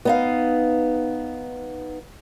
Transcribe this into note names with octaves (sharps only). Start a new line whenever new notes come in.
B3 D#4 F5